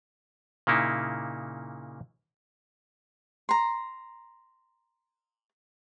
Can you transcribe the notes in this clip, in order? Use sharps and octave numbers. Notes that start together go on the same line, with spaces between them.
A#2 C#3 A#3 D#4 E4
A#5 C6